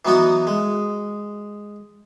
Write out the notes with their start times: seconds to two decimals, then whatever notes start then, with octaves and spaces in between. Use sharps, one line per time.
0.05 E3 F#3 B3 D#4 F#4
0.47 G#3